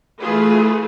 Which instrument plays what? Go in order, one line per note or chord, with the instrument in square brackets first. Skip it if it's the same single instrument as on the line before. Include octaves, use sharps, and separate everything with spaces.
[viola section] E3 A3 F4 G#4 B4